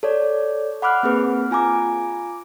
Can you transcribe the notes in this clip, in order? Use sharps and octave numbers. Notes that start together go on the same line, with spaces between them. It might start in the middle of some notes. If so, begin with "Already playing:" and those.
A4 C#5 D5
F#5 B5 D6 F6 F#6
A#3 C4 G#4 B4
F4 G#5 A#5 D6